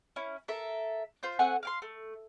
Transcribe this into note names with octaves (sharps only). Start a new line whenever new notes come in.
C#4 E4
A4 A#4 E5
F4 C5 G6
A3 C4 F#5 G#5
F5 G5 C6
A3